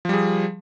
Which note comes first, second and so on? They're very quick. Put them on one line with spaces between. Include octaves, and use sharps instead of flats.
F3 G3 G#4